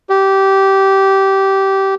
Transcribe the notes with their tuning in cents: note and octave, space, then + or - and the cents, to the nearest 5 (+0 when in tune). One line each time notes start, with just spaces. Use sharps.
G4 -15